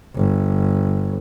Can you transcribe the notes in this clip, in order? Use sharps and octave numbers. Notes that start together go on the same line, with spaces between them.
G1